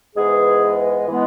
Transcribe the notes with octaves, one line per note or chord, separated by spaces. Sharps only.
G#2 E3 G#3 B3 G#4
E3 G#3 B3